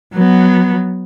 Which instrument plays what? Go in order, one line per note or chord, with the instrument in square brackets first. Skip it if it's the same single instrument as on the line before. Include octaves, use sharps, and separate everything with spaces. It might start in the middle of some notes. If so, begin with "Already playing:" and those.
[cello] F#3 B3